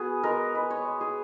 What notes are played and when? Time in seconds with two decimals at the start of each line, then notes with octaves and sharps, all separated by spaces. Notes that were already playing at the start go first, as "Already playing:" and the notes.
Already playing: B3 F#4 G#4
0.23 G#3 A#4
0.54 G#3 B4
0.70 C#5
0.84 G#3
1.01 G#4